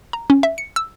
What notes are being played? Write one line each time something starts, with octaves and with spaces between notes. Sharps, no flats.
A#5
C#4
E5
C#7
E6